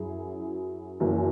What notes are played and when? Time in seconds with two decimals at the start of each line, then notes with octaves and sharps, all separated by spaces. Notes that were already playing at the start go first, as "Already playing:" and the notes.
Already playing: F#2 F#3 E4 G#4
1.00 F#1 F#2 E3